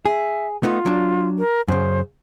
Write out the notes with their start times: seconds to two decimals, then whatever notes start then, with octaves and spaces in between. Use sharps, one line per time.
0.05 G#4 E5
0.63 A3 B3 D#4 F4
0.86 F#3 D4
1.39 A#4
1.68 F#2 C#3 C5